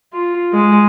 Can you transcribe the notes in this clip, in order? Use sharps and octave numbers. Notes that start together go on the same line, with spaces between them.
F4
G#3